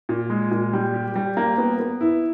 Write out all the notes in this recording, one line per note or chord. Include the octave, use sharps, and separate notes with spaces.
A#2
G#3
A#2
G3
G4
G3
A#3
B3
B3
E4